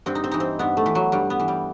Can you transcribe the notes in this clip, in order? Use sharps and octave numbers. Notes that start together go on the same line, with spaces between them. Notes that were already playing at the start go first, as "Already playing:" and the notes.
G2 C4
D#4
C4
E3 D#4
C4
G2 B3
A3
E3
F#3
G2 G3
B3
E3
G3